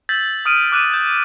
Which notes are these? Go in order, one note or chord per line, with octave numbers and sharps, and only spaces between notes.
E6 G6 A6 B6 F#7
D#6 F6 D7 D#7
D6 F#6 D#7 E7
G6